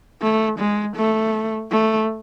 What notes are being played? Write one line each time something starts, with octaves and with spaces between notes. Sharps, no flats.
A3
G#3
A3
A3